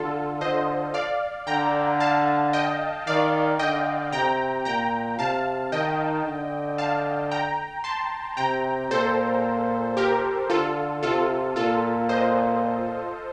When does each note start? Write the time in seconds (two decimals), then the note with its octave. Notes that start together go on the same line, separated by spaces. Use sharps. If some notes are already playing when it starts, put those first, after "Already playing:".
Already playing: D3 F4 A4
0.41 D3 C5 D#5
0.94 D5 F5
1.47 D3 G5 A#5
2.00 F5 A5
2.53 D#5 G5
3.07 D#3 D5 F5
3.59 D3 D#5 G5
4.12 C3 G5 A#5
4.65 A#2 G5 A#5
5.19 C3 F5 A5
5.72 D#3 D#5 G5
6.25 D3
6.78 F5 A5
7.31 G5 A#5
7.84 A5 C6
8.37 C3 G5 A#5
8.91 A#2 A4 C5
9.97 G4 A#4
10.50 D3 F4 A4
11.03 C3 F4 A4
11.56 A#2 F4 A4
12.09 C5 D#5